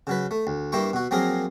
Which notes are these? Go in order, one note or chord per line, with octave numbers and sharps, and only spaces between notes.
C#3 F#3 B4
A3
D2
G2 A#3 E4 G5 C#6
B2 F#4
F3 F#3 A#3 C4 G#4 A#4